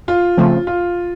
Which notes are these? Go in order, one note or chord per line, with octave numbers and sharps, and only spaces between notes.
F4
C#3 F3 A3 C4
F4